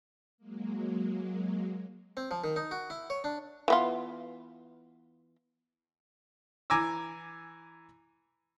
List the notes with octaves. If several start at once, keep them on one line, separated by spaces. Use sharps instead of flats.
F#3 G#3 A#3
C4
F3
D#3
D#4
F#4
E4
C#5
D4
E3 B3 F4
E3 G#5 A#5 D6 E6